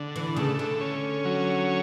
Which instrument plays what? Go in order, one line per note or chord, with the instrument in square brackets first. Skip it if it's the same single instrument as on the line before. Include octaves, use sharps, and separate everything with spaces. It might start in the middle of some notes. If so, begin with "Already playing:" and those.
Already playing: [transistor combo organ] D3
[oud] E3
[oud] C#3 [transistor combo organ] A3
[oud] D3
[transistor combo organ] C#4
F#3